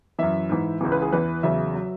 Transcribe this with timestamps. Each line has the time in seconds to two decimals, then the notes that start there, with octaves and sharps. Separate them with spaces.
0.19 F#2 E3 E5
0.49 G#2 E3
0.81 C#2 C#3 E3
0.92 B4
1.02 G#4
1.13 E2 E3 B4
1.43 E2 C#3 F#3 E5
1.74 F#3